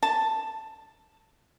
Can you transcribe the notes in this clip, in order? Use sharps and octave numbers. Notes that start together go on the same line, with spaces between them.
A5